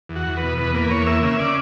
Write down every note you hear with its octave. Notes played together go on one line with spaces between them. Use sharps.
E2
F#4
E2
B4
B2
E2 B4
A#3 B4
E2 C#5
A#3 E5
C#3 E5
C#3 D5